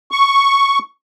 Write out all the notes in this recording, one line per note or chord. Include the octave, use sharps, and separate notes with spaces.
C#6